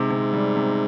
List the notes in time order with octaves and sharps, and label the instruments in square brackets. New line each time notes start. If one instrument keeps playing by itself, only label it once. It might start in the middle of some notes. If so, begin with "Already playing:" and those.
Already playing: [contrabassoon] G#2 [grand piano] C3
[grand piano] C3
G3
C3